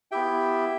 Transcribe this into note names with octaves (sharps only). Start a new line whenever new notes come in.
B3 E4 G4 E5 G5